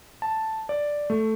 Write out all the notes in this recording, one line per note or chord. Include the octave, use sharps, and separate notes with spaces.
A5
D5
A3